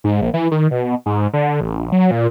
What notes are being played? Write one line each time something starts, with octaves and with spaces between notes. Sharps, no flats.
G#2
A#1
E3
D#3
B2
G#2
D3
A1
A#1
F#3
A#2